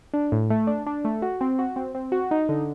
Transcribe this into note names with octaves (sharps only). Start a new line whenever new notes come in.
D4
A2
A3
D4
D4
A3
F#4
C4
F#4
C4
C4
F#4
D#4
D3